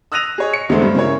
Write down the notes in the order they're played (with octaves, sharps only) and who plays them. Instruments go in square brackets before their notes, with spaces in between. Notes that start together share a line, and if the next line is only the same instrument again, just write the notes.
[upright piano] D#6 E6 F#6 A#6 D#7 F7
G#4 C#5 D#5
C#7
E1 D3 G#3 A3 C5
G2
C#3 E4 A#4 C#5